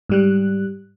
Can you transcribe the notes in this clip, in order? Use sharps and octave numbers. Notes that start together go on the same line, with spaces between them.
G#2 G3 F#6